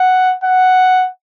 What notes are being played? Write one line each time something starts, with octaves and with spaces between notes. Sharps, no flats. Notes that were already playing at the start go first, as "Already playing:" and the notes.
Already playing: F#5
F#5